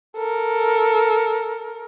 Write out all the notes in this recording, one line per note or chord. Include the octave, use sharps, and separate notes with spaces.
A4 A#4